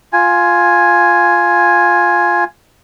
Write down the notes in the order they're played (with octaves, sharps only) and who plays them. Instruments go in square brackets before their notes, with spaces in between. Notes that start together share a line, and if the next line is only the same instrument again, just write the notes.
[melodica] F4 G#5